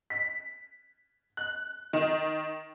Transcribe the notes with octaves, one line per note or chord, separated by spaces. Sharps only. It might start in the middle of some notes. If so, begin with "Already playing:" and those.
B6
F#6
D#3